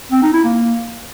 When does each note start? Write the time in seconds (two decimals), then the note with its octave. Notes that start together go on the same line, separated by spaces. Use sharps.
0.12 C4
0.23 D#4
0.34 E4
0.45 A#3